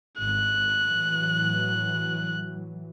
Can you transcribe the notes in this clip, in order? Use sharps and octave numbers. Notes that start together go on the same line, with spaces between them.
G#1 F#6
A2 E3 F#3